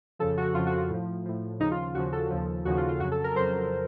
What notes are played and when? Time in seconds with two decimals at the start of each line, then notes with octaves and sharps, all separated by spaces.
0.19 F2 C#3 F3 A4
0.37 F#4
0.54 F2 C#3 F3 F4
0.67 F#4
0.78 F4
0.90 A2 F3
1.26 A2 F3
1.60 D#2 C#3 F3 D#4
1.71 F4
1.83 F4
1.95 D#2 C#3 F3 F#4
2.13 A4
2.30 D#2 C#3 F3
2.65 D#2 C#3 F3 F#4
2.77 F4
2.89 F4
3.00 F2 C#3 F#3 F#4
3.12 A4
3.24 A#4
3.36 F2 C#3 F#3 C5